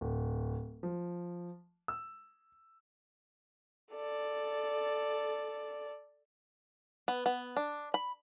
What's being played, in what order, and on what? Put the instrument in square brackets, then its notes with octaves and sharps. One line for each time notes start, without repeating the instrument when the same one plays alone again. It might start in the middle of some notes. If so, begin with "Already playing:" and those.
[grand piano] D1
F3
E6
[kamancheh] A4 D5
[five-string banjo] B3
B3
D4
B5